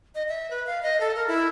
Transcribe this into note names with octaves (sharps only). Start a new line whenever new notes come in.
D#5
E5
B4
F5
D#5
A4
A#4
E4